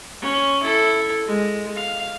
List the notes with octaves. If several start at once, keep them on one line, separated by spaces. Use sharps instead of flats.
C#4
E4 A4
G#3
F5